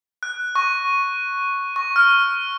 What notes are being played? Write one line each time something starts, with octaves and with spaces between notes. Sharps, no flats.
F#6
C#6
C#6
F6